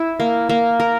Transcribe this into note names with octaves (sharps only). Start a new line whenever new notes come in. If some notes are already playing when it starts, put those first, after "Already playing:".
Already playing: E4
A#3
A#3
A#4